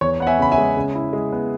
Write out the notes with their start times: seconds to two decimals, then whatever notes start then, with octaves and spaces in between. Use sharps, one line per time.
0.01 E2 C#5
0.20 B3 F#5
0.27 E5 G#5
0.39 C#3 B5
0.52 E5 G#5
0.58 G#3
0.77 C#3
0.95 E4
1.13 G#3
1.33 B3